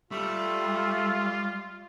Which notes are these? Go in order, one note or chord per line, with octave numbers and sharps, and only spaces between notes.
G3 A3 F4